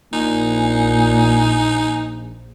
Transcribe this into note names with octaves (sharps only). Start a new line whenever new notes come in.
A#1 A#2 D#4 G#5